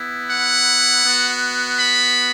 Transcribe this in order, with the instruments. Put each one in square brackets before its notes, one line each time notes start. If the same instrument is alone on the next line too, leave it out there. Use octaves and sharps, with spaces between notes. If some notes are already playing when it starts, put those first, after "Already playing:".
Already playing: [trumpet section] B3 E4
F#5
B3 F#4
B5